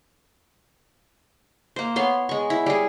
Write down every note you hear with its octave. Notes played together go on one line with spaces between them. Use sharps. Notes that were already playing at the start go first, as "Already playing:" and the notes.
A#3 C5
B3 C#5 C6
G#3 C#6
E4
G3 G#4